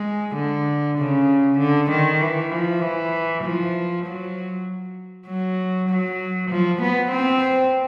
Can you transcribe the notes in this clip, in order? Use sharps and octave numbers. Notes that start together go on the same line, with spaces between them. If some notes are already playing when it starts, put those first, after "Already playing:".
Already playing: G#3
D3
C#3
D3
D#3
E3
F3
E3
F3
F#3
F#3
F#3
F3
B3
C4